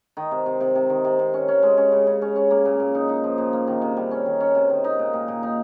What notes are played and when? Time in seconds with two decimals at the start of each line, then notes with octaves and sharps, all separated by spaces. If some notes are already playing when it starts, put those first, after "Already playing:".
0.17 D#3
0.31 C3
0.46 C3
0.61 C3
0.75 C3
0.90 D#3
1.05 C3
1.19 C3
1.34 C#4
1.48 C#4
1.63 G#3
1.77 C#4
1.92 C#3
2.07 C#3
2.22 C#4
2.36 C#4
2.51 A#3
2.65 A#2
2.80 A#2
2.95 D#4
3.09 D#4
3.24 F3
3.38 A#2
3.53 A#3
3.67 D#3
3.82 C3
3.97 G3
4.11 C#4
4.26 D#3
4.40 C#4
4.55 C3
4.70 D#3
4.84 D#4
4.99 A#2
5.13 A#2
5.28 A#2
5.43 D#4